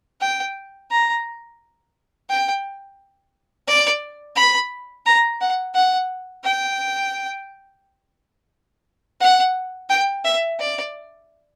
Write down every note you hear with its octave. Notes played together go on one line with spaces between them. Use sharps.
G5
A#5
G5
D5
B5
A#5
F#5
F#5
G5
F#5
G5
E5
D5